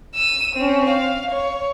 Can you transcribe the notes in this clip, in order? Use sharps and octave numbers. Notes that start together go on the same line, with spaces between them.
E6 D#7
C4 C#4
F5
C#5